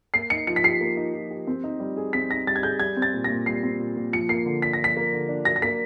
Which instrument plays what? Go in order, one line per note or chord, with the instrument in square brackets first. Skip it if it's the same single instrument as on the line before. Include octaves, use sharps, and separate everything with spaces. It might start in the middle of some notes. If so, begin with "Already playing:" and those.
[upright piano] A#3 [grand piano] C7
[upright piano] D#4 [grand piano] C#7
[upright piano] F3 [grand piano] C#7
[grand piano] B6
[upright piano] G4 [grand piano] C7
[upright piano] A#3
D#4
F3
G4
C4
D#4
G3
G#4
[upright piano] C4 [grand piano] B6
[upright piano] D#4 [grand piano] A#6
[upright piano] G3 [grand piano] A6
[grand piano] G#6
[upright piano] G#4 [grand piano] G6
[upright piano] G3 [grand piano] G#6
[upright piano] C4
[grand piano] A6
[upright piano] A#2
[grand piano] A#6
[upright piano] A#2
[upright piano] G3 [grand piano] C7
[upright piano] C4
A#2
A#2
[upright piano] F3 [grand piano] C#7
[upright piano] A#3 [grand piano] C7
[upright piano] D3
[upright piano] D4 [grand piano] B6
[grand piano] A#6
[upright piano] F3 [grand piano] B6
[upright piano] A#3
D3
D4
[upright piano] F#3 [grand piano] A#6
[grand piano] A#6
[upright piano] A#3 [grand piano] B6